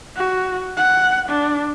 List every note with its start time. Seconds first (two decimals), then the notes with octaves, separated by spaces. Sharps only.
0.16 F#4
0.77 F#5
1.29 D4